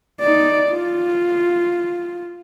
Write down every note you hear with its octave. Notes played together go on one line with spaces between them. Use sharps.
D#4 D5
F4